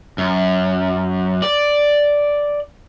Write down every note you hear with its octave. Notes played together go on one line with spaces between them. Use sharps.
F#2
D5